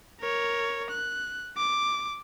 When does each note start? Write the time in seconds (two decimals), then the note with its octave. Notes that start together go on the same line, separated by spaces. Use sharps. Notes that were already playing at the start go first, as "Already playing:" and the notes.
0.20 A#4 C#5
0.90 F#6
1.57 D6